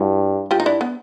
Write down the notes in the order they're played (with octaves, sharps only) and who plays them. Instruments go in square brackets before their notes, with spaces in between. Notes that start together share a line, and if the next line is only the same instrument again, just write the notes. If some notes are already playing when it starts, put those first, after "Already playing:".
Already playing: [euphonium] G2 [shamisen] E4 F#4
[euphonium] G2 [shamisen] F4 G4
[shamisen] D#4
D4 E4
B3